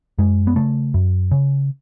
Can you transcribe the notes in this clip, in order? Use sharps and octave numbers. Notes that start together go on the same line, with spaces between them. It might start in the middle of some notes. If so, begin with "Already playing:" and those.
F#2 G#3
B3
C#3 A3
F#2
C#3